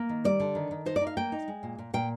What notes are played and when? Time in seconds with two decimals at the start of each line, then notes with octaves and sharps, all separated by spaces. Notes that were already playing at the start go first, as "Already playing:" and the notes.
Already playing: A#3
0.09 D#3
0.24 G3 D5
0.40 D3
0.55 D#3
0.71 D#3
0.86 D#4 C5
0.96 D5
1.01 D#4
1.07 F5
1.17 A#3 G5
1.32 D#4
1.48 G#3
1.63 A#2
1.79 A#2
1.94 A#2 G5